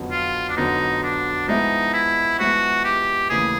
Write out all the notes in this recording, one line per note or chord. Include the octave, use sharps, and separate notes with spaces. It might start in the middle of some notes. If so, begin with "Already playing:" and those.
Already playing: F2 D3 F#3 B3
F4
D4
F2 D3 F#3 B3 D#4
D4
F3 G#3 B3 D#4 E4
E4
F3 G#3 B3 E4 F#4
G4
D#2 C#3 E3 A3 G#4